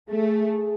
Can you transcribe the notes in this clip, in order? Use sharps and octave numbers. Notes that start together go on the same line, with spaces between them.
A3 G#4